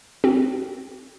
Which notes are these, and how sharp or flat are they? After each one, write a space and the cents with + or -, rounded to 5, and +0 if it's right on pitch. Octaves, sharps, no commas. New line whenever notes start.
C4 +0 F#4 +40